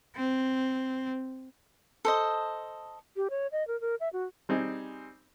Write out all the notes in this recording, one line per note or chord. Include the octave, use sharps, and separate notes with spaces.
C4
A4 C5 D#5
G4
C#5
D#5
A#4
A#4
E5
F#4
G3 C4 D#4 G#4